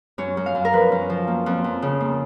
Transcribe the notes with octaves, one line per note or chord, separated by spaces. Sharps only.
F#2 C#5
F#2
F5
F#2
A#4
F3 B4
F#2
F3
A#3
F2
F2
C#3
A#3